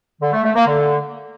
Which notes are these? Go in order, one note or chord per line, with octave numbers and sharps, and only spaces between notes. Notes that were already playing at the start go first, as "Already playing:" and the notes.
D3
A3
A3
A#3
D3